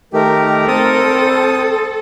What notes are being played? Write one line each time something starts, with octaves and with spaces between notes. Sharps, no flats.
D#3 A3 G4 A#4
C4 A4 D#6